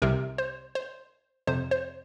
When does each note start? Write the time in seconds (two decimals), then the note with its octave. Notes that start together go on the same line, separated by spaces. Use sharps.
0.02 C2 C3 A#4
0.38 C5
0.75 C5
1.47 F2 C3 C5
1.71 C5